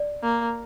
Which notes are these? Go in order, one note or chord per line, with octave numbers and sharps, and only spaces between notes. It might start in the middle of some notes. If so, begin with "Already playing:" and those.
Already playing: D5
A#3